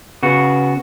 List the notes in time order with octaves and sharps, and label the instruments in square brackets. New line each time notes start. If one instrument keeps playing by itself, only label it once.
[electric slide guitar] C#3 B3 F#4